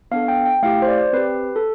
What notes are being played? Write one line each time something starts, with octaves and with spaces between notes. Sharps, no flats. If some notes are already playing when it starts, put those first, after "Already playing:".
B3 D4 A4 F5
G5
G5
A3 E4 G4 F5
C5
D5
C4 G4 B4
A4